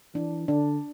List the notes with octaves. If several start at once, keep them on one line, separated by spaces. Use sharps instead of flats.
E3 D4
D3 D4